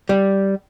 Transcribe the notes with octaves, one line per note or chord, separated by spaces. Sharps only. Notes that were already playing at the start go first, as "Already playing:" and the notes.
G3